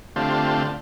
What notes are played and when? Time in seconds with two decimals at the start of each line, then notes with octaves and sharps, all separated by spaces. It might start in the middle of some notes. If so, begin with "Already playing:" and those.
0.16 D3 A3 C4 F4 G4